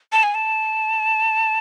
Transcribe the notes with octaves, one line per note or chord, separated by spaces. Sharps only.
A5
G#5
A5